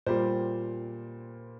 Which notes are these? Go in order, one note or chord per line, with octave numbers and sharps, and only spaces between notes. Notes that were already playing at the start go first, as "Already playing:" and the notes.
A#2 G3 A#3 C5